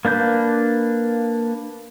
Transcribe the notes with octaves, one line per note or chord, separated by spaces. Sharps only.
A#3 D4 B4 G6